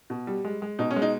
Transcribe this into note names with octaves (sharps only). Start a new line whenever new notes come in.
B2
G3
G#3
G#3
B2 D#4
C#4
G#3
D#4